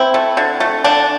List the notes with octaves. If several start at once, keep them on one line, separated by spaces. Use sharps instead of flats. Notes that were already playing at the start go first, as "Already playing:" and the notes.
Already playing: C4 E4
A3
D3
A3
D3 D4